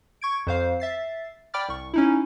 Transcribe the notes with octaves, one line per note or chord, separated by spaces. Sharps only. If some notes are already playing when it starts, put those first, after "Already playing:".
C#6 G#6 D7
F2 C5 F5
E5 A6 C7
D5 G5 B5 D6 F6 A6
C2 C#6
C#4 D#4 E4